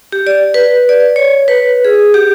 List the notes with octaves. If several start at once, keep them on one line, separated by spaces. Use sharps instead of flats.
G4
D5
B4
D5
C#5
B4
G#4
G4